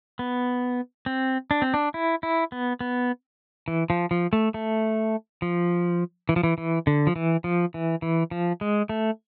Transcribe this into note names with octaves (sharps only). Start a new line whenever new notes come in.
B3
C4
D4
C4
D4
E4
E4
B3
B3
E3
F3
F3
A3
A3
F3
E3
F3
E3
E3
D3
F3
E3
F3
E3
E3
F3
G#3
A3